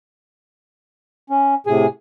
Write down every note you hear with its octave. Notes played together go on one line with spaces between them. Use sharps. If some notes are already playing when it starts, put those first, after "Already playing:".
C#4
A2 C3 G#4 G#5